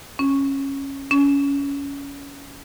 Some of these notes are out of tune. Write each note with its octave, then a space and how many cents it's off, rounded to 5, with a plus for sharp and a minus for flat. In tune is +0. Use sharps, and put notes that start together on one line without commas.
C#4 -15
C#4 +20